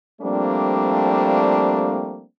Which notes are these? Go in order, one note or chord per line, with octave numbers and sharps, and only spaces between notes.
F3 G3 A3 A#3 C4 D4